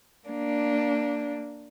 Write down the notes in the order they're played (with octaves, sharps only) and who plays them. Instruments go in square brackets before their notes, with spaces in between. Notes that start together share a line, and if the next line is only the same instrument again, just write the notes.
[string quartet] A#3 D4